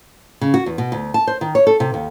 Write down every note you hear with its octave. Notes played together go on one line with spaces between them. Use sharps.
C#3
F#4
E2
B2
D2
A5
C5
D#3
C#5
A4
C3
D#2